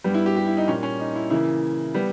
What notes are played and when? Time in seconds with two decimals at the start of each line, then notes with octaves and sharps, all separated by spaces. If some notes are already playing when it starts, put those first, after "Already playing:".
0.04 G2 G3 B3
0.14 E4
0.26 G4
0.36 G4
0.47 E4
0.57 D#4
0.67 A#2 G3 A#3 C#4
0.83 C#4
1.00 D#4
1.16 E4
1.30 C#3 E3 A#3 E4
1.94 G3 B3